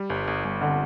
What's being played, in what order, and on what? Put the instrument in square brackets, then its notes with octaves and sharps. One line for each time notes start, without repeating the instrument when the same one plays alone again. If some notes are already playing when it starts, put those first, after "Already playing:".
Already playing: [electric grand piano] G3
G1
G1
G1
[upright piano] D3